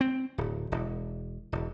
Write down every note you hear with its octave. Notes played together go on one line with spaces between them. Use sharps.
C4
D1
E1
E1